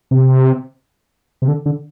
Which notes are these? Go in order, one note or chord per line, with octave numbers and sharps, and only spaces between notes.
C3
C3
D3
D3